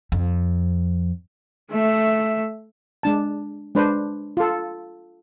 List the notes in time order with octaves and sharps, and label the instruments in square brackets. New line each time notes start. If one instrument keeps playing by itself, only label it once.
[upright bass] F2
[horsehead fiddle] A3 E5
[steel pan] G#3 D4 A5
G#3 D4 B4 C5
F4 A4